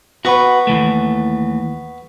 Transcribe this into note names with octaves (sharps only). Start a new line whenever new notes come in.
B3 F#4 B4 C#6
D#2 E3 A3